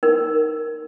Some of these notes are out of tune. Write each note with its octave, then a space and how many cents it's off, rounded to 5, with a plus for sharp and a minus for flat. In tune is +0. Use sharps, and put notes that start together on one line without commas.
D#4 +0 A#4 +0